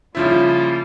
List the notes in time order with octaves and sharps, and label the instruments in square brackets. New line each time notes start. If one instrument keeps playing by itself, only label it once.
[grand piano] C#3 F3 E4 [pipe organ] G3 A#3 F4